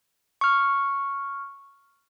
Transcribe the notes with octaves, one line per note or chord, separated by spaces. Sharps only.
C#6 F6